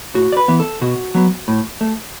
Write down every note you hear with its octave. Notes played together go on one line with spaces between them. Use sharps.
A2 F#4
D5
B4
E3 B3
A4
B2 F#4
F#3 B3
A2
A3